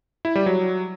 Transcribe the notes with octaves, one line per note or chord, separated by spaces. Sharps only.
E4
G3
F#3